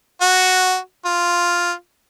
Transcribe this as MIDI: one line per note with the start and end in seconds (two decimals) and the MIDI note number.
0.21 0.77 66
1.05 1.73 65